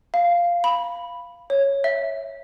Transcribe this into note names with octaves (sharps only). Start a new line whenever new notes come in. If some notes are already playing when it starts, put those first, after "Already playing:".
F5
B5
C#5
E5